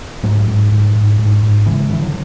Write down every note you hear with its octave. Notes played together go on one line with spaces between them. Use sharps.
G#2 F#3 A3
G#2
G#2
G#2
G#2
G#2
C#3 E3 G#3
C#3 E3
D3 F#3